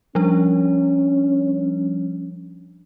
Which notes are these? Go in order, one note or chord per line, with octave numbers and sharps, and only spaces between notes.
F3 G3 C#4 D4